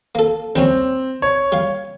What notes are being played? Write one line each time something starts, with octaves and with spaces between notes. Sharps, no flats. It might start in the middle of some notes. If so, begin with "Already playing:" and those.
A#3 A4
D#2 G3 C4 C#4
C#5
G3 F5